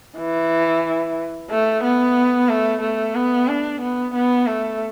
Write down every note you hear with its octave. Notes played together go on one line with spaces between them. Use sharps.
E3
A3
B3
A3
A3
B3
D4
B3
B3
A3